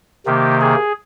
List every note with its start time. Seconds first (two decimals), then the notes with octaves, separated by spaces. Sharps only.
0.26 C3 D#3 A#3 G4
0.61 G#4